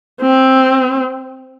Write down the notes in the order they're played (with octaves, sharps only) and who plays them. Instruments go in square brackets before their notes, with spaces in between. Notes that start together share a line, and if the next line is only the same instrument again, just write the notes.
[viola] C4